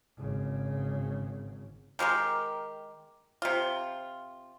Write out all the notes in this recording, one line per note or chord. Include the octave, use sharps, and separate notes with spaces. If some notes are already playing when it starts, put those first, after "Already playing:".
G#1 C#3
D#3 G#3 G4 A#4
C3 F4